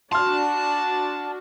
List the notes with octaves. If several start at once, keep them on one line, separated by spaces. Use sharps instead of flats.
D4 F#4 A5 C6 F6